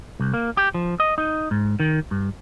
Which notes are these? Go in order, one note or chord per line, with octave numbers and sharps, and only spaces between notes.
C2
A#3
G4
F3
D#5
D#4
G#2
D#3
G2